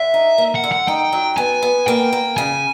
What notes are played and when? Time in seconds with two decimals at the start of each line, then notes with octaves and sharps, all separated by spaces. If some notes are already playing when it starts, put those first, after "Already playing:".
Already playing: D3 E5
0.14 D#4
0.38 A#3
0.55 F#5
0.64 D3
0.71 F#5
0.88 D#4 G5
1.12 F#3
1.37 B3 G#5
1.63 B3
1.87 A#3 G5
2.13 A#3
2.37 C#3 G#5